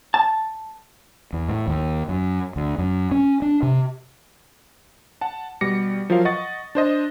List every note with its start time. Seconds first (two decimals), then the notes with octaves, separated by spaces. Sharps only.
0.14 A5
1.33 E2
1.49 A2
1.67 D#2
2.09 F#2
2.56 D2
2.78 F#2
3.11 C#4
3.42 D4
3.63 C3
5.21 F#5 A5
5.61 B2 G3 D6 A#6 C#7
6.10 F3 F#3 F4 A#4 F5
6.25 D#5 F#5 C#6 A6
6.75 D4 C5 D#5